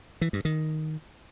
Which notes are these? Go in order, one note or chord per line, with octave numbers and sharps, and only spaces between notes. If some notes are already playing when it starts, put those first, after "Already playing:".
E3
G2
D#3